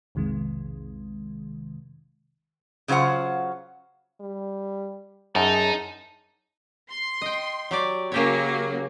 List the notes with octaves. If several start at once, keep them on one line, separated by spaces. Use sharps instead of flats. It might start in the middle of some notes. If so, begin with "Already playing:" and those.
B1 F2 C3 D#3 G#3
C#3 F#3 F4 C5 F#5
G3
F#2 D#4 G#4 A5
C6
D#5 G5
F#3 G4 D5
C#3 F#3 A#3 G4 C#5